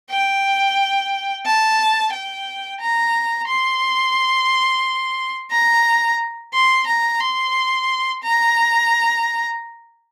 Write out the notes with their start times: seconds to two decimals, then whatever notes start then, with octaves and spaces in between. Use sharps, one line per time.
0.10 G5
1.46 A5
2.13 G5
2.81 A#5
3.48 C6
5.51 A#5
6.54 C6
6.87 A#5
7.21 C6
8.23 A#5